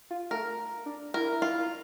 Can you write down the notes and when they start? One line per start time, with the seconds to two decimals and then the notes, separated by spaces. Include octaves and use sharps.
0.11 F4
0.31 A3 A#4
0.86 D4
1.14 E4 A#4
1.42 F4